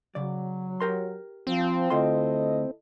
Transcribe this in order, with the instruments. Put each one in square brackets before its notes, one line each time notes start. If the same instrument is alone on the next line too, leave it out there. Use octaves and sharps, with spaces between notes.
[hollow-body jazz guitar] C#3 D5 [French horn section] F#3
[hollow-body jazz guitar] G4 A#4 C6
[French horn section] F3 [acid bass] C4
[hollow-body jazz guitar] D2 F4 C6 [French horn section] E4 A4 D#5